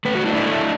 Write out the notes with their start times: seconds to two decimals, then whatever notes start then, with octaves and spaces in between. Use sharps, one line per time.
0.05 A3 B4
0.15 F#4
0.25 D4 E4
0.35 E4
0.45 A3